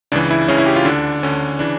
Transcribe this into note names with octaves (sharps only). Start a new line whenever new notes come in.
C#2 C#3 E3 D4
E4
C#2 C#3 E3 C#4
E4
G4
F4
D2 D3 D4
D2 D3 C#4
C#3 E3 D4